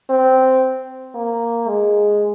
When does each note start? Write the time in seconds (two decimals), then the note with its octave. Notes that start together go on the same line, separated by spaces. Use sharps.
0.10 C4
1.15 A#3
1.68 G#3